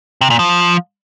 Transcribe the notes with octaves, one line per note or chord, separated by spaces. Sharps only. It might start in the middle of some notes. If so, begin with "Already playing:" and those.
C3
A#2
F3